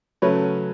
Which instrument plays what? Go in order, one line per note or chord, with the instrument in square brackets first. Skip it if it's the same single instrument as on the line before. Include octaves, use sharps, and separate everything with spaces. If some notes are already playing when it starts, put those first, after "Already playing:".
[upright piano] C#3 F#3 A3 B4 C#5